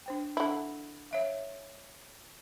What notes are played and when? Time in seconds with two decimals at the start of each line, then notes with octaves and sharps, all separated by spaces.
0.06 D4 C5 G5
0.37 D3 E4
1.11 C#5 E5 F5